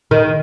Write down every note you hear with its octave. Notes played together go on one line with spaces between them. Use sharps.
D#3